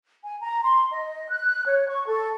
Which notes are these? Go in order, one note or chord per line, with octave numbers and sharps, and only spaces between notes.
G#5
A#5
C6
D#5
F#6
C#5
C#6
A4